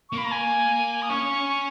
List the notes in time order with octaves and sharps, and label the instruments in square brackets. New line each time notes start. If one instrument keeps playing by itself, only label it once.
[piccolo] C#6
[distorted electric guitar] A#3 [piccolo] B5
[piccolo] A#5
G#5
D#6
[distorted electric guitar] C#4 [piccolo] C#6